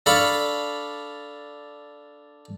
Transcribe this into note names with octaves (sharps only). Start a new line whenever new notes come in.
D4 A4 F5 B5 C#6